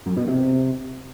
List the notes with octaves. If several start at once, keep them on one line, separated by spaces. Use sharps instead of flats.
F#2
B2
C3